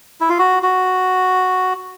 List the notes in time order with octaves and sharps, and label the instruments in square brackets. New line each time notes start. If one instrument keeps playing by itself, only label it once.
[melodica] E4
F4
F#4
F#4